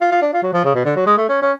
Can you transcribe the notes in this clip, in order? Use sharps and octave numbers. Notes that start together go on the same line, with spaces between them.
F4
F4
D4
F4
F#3
F3
C#3
B2
D3
F#3
G#3
A3
C#4
C#4